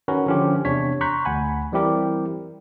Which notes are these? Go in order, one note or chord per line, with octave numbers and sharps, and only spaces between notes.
D#3 C#4 F#4 A#4 B4
D3 F3 C#4 F4 G4
E2 C3 D4 C#5 B6
A#5 C6 C#6 F#6 G6 B6
D2 F#5 G#5 B5
E3 G3 C4 E4 G4 A#4